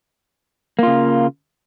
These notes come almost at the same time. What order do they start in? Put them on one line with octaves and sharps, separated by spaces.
A#3 F4 C#3